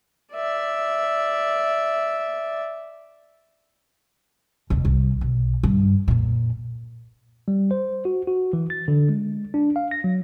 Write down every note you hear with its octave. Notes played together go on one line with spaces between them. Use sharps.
D5 E5
F1 D#2
C2
B1
G2
F2 A#2
G3
C5
F#4
F#4
E3
A6
D3
G#3
D4
F5
A#6
F#3